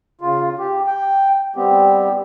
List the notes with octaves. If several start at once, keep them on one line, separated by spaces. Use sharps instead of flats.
C#3 F4
G4
G5
G3 B3 C4 G4